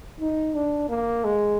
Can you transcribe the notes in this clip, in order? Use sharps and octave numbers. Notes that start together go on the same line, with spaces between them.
D#4
D4
A#3
G#3